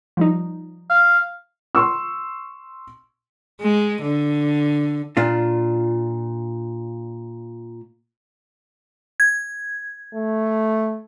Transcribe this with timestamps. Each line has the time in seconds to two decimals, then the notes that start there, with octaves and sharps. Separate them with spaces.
0.17 F3 G3 D#4
0.90 F5
1.75 C6 C#6 E6
3.61 G#3
4.02 D3
5.17 A#2 D4 F4
9.20 G#6
10.14 A3